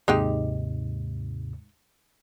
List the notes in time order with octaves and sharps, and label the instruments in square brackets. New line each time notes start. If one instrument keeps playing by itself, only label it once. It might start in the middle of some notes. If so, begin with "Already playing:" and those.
[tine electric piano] D#2 G#2 C3 [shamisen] G#3 D#4 G4